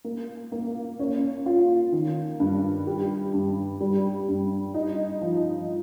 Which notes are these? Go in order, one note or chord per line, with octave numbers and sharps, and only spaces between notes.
A#3
A#3
C#4
F4
D#3
G2
G4
G2
G3
G2
D#4
F3